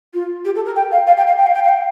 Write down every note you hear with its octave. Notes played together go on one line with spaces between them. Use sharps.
F4
G4
A4
A#4
G5
F5
F5
G5
F5
G5
F5
G5
F5
G5